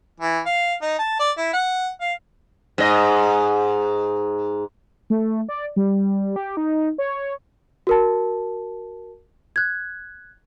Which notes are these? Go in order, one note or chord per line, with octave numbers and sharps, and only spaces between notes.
E3
F5
D#4
A5
D5
E4
F#5
F5
G#2 D#5
A3
D5
G3
G4
D#4
C#5
F#4 A#4 A5
F#6 G#6